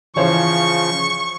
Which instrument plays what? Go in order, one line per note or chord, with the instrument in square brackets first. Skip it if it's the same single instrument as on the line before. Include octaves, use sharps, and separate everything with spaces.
[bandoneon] C#3 F3 [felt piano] E3 C5 C#5 [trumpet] C#6